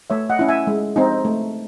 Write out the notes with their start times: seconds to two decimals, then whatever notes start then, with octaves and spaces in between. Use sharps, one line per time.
0.10 A3 C#5 E5
0.30 D#5 F#5
0.39 C#4 E4
0.49 E5 G#5
0.67 G#3
0.96 C4 D#4
1.25 A3